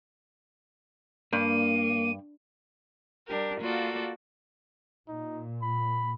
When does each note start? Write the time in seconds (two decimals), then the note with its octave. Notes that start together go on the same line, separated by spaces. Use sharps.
1.33 G2 A#3 D#7
3.27 G3 D4 G4 A#4
3.61 A#3 F4 F#4 A4 D5
5.09 A#2 D#4
5.63 B5